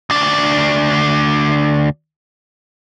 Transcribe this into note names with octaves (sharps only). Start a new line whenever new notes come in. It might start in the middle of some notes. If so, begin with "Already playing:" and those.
D2 D4